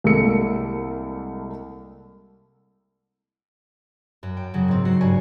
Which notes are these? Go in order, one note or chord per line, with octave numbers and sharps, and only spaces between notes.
C2 G#3 A#3 A4 E6 C#7
F#2
G5
F#2 C#3 F#3
G#2 C4
F#3 F#4 C5 C7
F#1 G2 C#5 G#5